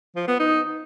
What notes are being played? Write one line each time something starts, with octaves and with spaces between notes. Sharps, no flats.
F3
B3
D#4